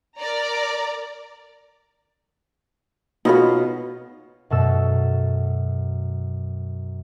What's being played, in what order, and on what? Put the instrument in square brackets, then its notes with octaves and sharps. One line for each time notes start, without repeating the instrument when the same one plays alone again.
[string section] A#4 D5 A#5
[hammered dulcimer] B2 C#5 F5 [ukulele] D#4 F4 B4
[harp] F#2 B2 A4 E6